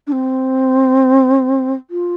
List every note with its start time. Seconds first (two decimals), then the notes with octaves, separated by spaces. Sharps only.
0.07 D4
0.12 C4
1.90 F4